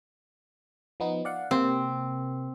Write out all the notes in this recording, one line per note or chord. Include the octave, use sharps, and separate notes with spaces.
F3 B3 D#4
D5 F5 F#5
C3 A#3 C4